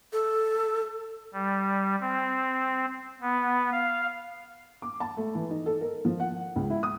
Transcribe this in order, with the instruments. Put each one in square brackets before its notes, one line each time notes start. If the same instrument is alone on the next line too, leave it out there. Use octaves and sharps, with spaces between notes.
[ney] A4
[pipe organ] G3
C4
B3
F5
[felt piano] D6
A5
A3
E3
D#4
A4
A#4
F3
F#5
C#2
E4
D#6